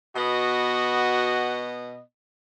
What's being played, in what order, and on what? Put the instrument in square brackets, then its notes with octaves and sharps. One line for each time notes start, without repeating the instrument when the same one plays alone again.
[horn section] B2 B3 D#5 [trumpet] F#4